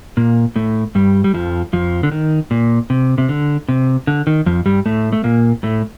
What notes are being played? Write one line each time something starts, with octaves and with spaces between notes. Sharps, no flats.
A#2 A#3
A2 A3
G2 G3
G3
F2 F3
F2 F3
D3
D#3
A#2
C3
C3
D3
C3
D3
D#3
F2 F3
G2 G3
A2 A3
A3
A#2 A#3
A2 A3